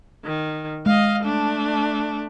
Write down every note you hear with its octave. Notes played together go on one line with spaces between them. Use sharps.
D#3
G#3 D#5 F5
A3 D4